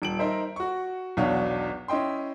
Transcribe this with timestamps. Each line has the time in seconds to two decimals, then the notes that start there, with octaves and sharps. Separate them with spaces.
0.02 D#1 D7 F#7
0.19 D#4 A#4 C5 E5
0.56 F#4 C#6
1.17 B1 E2 B2 D4 C#5 F5
1.88 C#4 E4 D#5 G5 C6